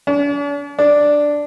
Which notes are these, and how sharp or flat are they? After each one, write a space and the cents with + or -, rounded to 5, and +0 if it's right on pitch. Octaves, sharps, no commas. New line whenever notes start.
D4 -45
D4 +0